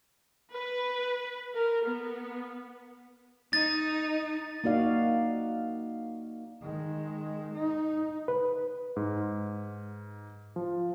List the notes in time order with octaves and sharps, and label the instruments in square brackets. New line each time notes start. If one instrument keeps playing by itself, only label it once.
[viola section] B4
A#4
B3
[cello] D#4 [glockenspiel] A6
[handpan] A#3 D#4 F#4 D5 F5
[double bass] D#3 G#3
D#4
[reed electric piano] B4
[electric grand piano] G#2
F3